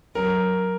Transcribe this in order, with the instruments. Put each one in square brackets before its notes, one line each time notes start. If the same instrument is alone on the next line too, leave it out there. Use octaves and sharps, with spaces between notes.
[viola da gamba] F#2 F#3 [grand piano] A#4